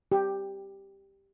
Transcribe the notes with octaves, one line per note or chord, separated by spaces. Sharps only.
G4